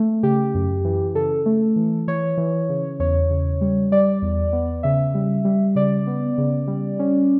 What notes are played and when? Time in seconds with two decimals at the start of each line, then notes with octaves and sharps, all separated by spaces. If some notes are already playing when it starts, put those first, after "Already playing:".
Already playing: A3
0.23 C#3 G4
0.54 F#2
0.85 E3
1.15 C#3 A4
1.46 A3
1.76 E3
2.08 E3 C#5
2.37 E3
2.69 C#3
3.00 E2 C#5
3.30 C#3
3.61 G3
3.92 G3 D5
4.22 E2
4.53 B3
4.83 C#3 E5
5.14 G3
5.45 G3
5.75 C#3 D5
6.07 B3
6.38 C#3
6.67 G3
6.99 C#4